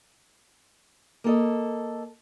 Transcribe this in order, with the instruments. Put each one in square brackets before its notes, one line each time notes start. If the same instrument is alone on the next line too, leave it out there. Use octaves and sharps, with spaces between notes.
[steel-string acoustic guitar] A#3 A4 D#5